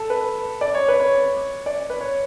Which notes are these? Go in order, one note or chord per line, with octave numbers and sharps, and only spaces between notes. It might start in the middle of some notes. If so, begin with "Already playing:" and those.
Already playing: A4
B4
D5
C#5
B4
C#5
D5
B4
C#5